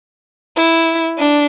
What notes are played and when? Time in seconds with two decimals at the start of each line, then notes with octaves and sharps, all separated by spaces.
0.56 E4
1.18 D4